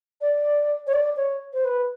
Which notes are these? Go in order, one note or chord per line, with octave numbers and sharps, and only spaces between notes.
D5
C#5
D5
C#5
C5
B4